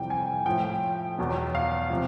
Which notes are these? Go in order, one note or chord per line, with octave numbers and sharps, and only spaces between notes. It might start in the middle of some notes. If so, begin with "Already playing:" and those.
Already playing: F2 C3 E3 G3 G5
G#5
A2 F3 G5
E2 B2 F#3
F5
C3 F3